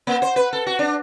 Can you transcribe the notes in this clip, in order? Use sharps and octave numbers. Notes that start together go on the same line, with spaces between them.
A#3
C5
B4
A4
F#4
D4